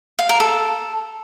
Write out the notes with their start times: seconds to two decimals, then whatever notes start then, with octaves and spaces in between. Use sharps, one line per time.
0.19 F5
0.29 A#4
0.40 A4